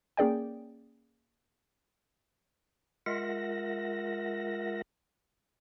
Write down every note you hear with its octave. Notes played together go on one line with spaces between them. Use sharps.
A#3 C#4 G#4 D5 G5
G#3 F4 A#4 E5 F#5 A#6